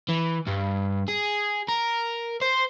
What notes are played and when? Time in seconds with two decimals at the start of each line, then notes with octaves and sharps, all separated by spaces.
0.09 E3
0.47 G2
1.08 G#4
1.69 A#4
2.41 C5